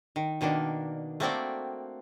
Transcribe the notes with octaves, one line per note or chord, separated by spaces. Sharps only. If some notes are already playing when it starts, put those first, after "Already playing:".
D#3
B2 D#3 A#3 D4
A3 A#3 C4 F#4 D5 G5